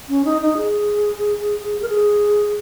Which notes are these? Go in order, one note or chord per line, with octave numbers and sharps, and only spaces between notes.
C#4
D#4
D#4
G#4
A#4
G#4